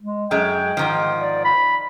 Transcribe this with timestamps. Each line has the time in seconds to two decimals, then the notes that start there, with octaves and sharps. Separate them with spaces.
0.03 G#3
0.31 F#2 G#3 G5
0.77 G#2 D#3 F3
1.19 D5
1.45 B5